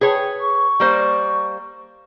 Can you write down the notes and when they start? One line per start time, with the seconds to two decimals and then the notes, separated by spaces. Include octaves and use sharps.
0.01 G#4 B4 C#5 G5
0.41 C#6
0.80 G3 A#3 C5